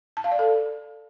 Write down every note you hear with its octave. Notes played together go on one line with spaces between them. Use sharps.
A5
F5
D5
A4